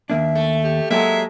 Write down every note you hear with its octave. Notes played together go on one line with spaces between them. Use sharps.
D#2 A#3 D4 E5
A3
G4
F#3 G#3 A#3 G4 A4 E5